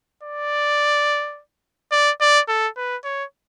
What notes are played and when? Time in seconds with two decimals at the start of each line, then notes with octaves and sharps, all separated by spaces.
0.23 D5
1.92 D5
2.21 D5
2.48 A4
2.77 B4
3.04 C#5